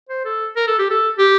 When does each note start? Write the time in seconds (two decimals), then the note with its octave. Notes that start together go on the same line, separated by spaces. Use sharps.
0.09 C5
0.25 A4
0.56 A#4
0.67 A4
0.79 G4
0.90 A4
1.18 G4